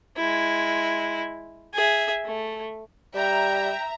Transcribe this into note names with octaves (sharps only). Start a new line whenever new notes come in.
G#3 E4
G#4 E5
A3
G3 E5 G5 A#5